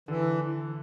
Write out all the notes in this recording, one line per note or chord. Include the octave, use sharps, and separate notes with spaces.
D3 E3